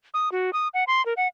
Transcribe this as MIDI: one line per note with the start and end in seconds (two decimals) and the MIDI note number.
0.14 0.32 87
0.32 0.51 66
0.53 0.68 87
0.74 0.84 78
0.87 1.04 84
1.06 1.14 70
1.17 1.28 78